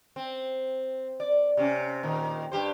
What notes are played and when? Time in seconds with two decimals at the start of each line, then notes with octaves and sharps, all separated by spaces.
0.16 C4
1.20 D5
1.57 C3 C#4
2.03 A#2 D#3
2.52 G2 G4 C5